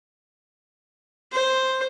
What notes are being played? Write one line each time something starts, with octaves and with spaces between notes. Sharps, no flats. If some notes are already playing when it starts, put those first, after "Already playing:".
C5